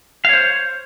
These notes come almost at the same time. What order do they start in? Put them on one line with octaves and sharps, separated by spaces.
F5 C#5 C5